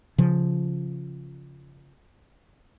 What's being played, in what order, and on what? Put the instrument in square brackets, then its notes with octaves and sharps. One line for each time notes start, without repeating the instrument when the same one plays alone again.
[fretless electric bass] C#3 F3